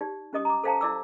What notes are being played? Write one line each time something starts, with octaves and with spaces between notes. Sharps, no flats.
D#4 G4 D5
C#4 G4 D#5 D#6
A#5 D6
A4 C5 F5 G5 A5 A#5
E4 D5 D6 E6